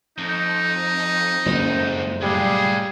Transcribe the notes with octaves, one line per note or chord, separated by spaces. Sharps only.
F2 D#4
F#1 F2 G#3 C4
A2 G3 F4 G#4